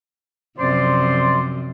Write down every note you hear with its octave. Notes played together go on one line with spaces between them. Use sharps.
F#2 C3 F3 C5 D5 C6